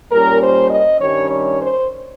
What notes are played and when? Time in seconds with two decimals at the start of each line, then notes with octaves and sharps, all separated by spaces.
0.12 A#2 G3 C#4 A#4
0.42 C5
0.70 D#5
1.01 G2 D#3 G3 C#4 C#5
1.31 C#5
1.60 C5